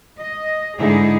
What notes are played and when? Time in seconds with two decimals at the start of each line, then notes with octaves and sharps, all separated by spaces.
0.18 D#5
0.78 G#2 D3 G#3 D#4 E4 G#4